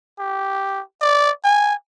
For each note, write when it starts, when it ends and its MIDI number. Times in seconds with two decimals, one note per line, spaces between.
0.19 0.81 67
1.01 1.31 74
1.44 1.74 80